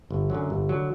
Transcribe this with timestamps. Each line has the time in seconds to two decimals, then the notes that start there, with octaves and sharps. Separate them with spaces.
0.11 G1
0.30 F#2 D3 F#3
0.50 G1
0.69 D3 F#3